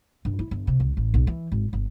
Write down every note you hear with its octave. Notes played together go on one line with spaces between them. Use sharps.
G2
E4
G1
C3
C#2
A1
B1
E3
G#1
G1